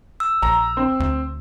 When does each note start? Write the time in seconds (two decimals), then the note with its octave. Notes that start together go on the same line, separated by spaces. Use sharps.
0.20 E6
0.42 A#1 A#5
0.77 C4
1.00 D2